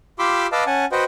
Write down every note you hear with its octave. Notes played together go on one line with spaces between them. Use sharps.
F4 G4 B5 C6 D6 E6
B4 D#5 F5 A5 D6 E6
C#4 F#5 G#5 A5
F#4 B4 C5 D#5 F#5 G5